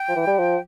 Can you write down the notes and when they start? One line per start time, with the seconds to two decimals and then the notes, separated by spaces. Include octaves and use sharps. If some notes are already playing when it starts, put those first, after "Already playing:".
Already playing: G5
0.08 F3
0.16 E3
0.27 G3
0.38 F3